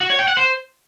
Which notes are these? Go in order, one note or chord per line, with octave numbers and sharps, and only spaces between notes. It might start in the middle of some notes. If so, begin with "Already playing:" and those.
F#4
C#5
G5
F#5
C5